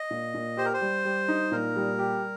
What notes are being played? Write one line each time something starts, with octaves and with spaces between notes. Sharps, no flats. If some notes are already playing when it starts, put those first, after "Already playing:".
Already playing: D#5
A#2
A#2
G4 C5
A#4
C5
G3
G3
D#4
A#2 A#4
G3
G4